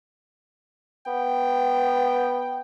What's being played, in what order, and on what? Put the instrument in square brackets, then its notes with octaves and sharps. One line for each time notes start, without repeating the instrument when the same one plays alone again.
[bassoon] B3 [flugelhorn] G5